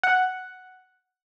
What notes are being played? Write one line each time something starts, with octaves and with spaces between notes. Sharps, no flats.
F#5